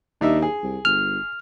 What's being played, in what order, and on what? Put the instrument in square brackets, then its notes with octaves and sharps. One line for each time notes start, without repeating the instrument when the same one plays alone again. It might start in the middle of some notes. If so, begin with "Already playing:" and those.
[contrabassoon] D#2 [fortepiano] D4 D#4 E5
[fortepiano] G#4
[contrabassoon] C2
[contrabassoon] G1 [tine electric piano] F6